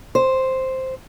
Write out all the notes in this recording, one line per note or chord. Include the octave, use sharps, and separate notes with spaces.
C5